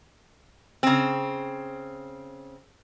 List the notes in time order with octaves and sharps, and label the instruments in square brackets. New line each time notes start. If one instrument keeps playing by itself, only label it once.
[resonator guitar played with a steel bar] C#3 C4